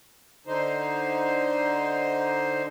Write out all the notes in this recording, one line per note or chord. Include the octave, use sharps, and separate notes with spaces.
D3 D#4 C5